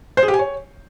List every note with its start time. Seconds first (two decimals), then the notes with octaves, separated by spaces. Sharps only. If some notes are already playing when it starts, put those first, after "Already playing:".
0.17 C5
0.23 G#4
0.28 G4
0.34 G#5
0.39 C#5